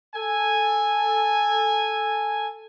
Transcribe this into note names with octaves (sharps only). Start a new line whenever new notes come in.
A4 G#5